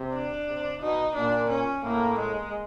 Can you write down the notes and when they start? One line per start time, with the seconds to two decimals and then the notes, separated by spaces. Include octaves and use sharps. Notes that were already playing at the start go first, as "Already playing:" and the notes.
Already playing: C3
0.13 D4
0.47 C3
0.81 B2 D#4
1.15 A#2 D4
1.50 C#4
1.84 A2 A#3
2.19 G#3